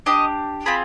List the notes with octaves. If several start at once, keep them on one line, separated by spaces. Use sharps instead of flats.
D4 G4 D#5
C4 F4 G#4 B5